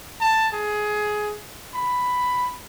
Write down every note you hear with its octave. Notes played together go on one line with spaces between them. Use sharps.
A5
G#4
B5